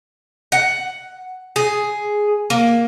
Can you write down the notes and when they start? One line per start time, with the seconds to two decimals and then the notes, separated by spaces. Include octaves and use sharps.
0.52 F#5
1.56 G#4
2.50 A#3